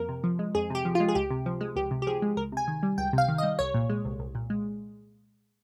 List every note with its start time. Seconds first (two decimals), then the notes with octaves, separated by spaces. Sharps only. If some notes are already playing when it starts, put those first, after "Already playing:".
Already playing: F2 A#3 A#4
0.09 C3
0.24 F3
0.39 G#3
0.55 F2 G#4
0.70 C3 G4
0.85 F3
0.95 F4
1.00 G#3
1.08 G#4
1.15 C#2 G4
1.30 C3
1.46 F3
1.61 G#3
1.76 C#2 G4
1.91 C3
2.02 G4
2.07 F3 G#4
2.22 G#3
2.37 C#2 A#4
2.52 C3 G#5
2.68 D#3
2.83 G3
2.98 C#2 G5
3.13 C3
3.18 F5
3.28 D#3
3.38 D#5
3.43 G3
3.59 C2 C#5
3.74 A#2
3.90 G#3
4.05 C2
4.19 C2
4.35 A#2
4.50 G#3